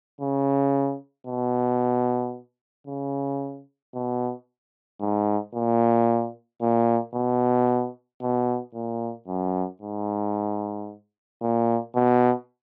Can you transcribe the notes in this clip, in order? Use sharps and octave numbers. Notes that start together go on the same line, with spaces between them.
C#3
B2
C#3
B2
G#2
A#2
A#2
B2
B2
A#2
F#2
G#2
A#2
B2